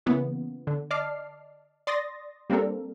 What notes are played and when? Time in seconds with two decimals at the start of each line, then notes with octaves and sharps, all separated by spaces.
0.06 C#3 E3 A#3 B3
0.67 D3
0.91 D5 D#5 A5 D6 F6 C7
1.87 D5 C6 D#6 A6 A#6
2.50 G3 A#3 C4 D4 A4 A#4